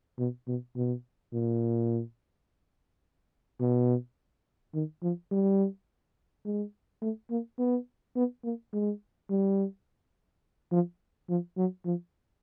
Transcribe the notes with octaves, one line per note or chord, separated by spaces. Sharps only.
B2
B2
B2
A#2
B2
D#3
F3
G3
G#3
A3
A#3
B3
B3
A#3
G#3
G3
F3
F3
F#3
F3